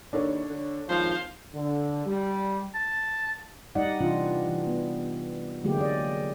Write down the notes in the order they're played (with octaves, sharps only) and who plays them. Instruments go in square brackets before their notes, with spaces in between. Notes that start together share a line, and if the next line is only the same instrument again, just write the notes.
[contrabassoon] D#2 [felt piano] D4 A4 C#5
[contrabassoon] D3
[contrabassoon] G#1 [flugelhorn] F3 [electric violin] C5 F5
[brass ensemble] D3
G3
[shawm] A5
[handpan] G3 D#4 D5 D#5 F#5
C3 E3 D4 F4
E3
B3
D3 F#3 G#3 A#3 G4
D5 D#5